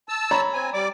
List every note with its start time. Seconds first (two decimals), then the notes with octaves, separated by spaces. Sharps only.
0.09 A5 E6
0.31 C#5 A#5 B5
0.54 C4 G#5
0.74 G3 D5 D6